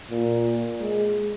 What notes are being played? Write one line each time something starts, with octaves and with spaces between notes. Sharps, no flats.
A#2
G#3